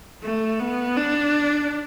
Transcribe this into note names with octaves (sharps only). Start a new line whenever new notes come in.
A3
B3
D4